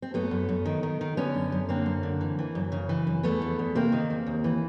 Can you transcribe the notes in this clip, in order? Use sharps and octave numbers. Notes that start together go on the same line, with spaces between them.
C4
F#2 A3 B3
F#2
F#2
D#3
D#3
D#3
D3 B3 C#4
F#2
F#2
D3 A#3 C4
F#2
D3
E3
E3
F#2
C#3
E3
F#2
E2 A3 B3
E2
E2
C3 A#3 C4
D#3
E2
D#2
E3